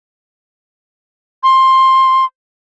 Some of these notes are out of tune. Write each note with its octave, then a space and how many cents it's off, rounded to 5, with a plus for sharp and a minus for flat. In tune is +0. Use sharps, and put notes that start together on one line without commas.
C6 +10